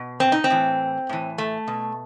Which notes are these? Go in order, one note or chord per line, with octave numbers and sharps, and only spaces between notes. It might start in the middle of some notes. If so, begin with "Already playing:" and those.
Already playing: B2
C4
D#4
C4
A2 E3
A2 E3
A3
B2